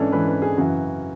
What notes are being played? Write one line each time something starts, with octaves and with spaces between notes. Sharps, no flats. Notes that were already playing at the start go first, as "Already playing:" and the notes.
Already playing: G#2 E3 C#4 D4 A4
G#2 E3 B4
B4
G#4
F#2 C#3 E3 F#4